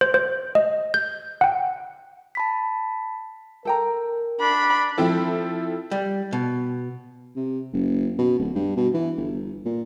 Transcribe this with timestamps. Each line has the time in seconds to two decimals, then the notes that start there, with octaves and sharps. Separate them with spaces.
0.01 C5
0.14 C5
0.55 D#5
0.94 G6
1.41 F#5 G5
2.35 A5 B5 B6
3.65 A4 A#4 G5 A#5
4.40 D4 B5
4.98 F3 C4 E4 A4
5.91 G3
6.33 B2
7.36 C3
7.73 F#1
8.18 B2
8.39 D1
8.55 G2
8.76 B2
8.94 E3
9.17 G1
9.65 A#2